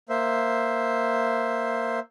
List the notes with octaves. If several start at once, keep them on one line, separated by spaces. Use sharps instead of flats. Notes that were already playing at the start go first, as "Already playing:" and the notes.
A#3 C5 E5